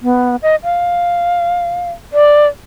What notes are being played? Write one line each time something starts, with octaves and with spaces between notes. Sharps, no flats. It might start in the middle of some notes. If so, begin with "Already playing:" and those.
B3
D#5
F5
D5